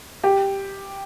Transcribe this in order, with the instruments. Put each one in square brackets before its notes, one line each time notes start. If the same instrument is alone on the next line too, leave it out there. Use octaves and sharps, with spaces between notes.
[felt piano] G4